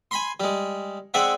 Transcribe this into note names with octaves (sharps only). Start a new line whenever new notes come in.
G#5 B5 C6
G3 G#3
G#3 C4 D5 E5 F#5